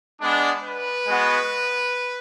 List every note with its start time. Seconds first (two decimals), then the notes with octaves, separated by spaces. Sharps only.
0.20 G#3 B3 D4
0.64 B4
1.07 G#3 B3 F#4